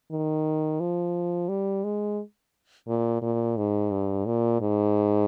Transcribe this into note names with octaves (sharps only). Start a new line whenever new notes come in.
D#3
F3
G3
G#3
A#2
A#2
G#2
G2
A#2
G#2